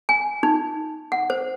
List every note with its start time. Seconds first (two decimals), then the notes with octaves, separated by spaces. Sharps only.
0.09 G#5
0.43 D#4
1.12 F#5
1.30 C5